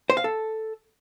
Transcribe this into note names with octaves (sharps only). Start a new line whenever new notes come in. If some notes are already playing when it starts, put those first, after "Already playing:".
C5
F5
A4